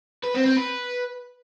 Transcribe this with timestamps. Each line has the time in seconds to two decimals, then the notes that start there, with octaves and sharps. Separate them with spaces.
0.23 B4
0.34 C4
0.46 C4
0.57 B4